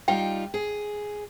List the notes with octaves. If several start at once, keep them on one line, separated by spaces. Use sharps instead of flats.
G3 D#4 F4 G5
G#4